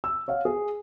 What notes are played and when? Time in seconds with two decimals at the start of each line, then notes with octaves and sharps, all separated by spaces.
0.04 E6
0.28 C#5 F5 F#5
0.45 G#4